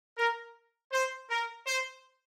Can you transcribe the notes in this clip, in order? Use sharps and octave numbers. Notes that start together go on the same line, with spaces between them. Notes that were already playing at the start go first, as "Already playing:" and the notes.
A#4
C5
A#4
C5